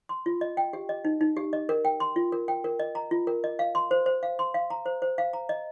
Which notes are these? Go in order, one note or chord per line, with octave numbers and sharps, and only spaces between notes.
C6
F4
D#5
G5
G4
D#5
D#4
D#4
G4
D#5
A#4
G5
C6
F4
A#4
G5
A#4
D#5
A#5
F4
A#4
D#5
F5
C6
C5
C5
F5
C6
F5
A#5
C5
C5
F5
A#5
D#5